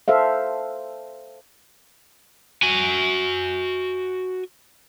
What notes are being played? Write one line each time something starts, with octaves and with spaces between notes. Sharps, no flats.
A4 C5 E5 F5
F#4 G#5